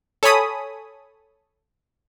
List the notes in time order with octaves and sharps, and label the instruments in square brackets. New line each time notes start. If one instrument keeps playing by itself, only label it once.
[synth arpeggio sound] A4 C#5 G#5 B5 D#6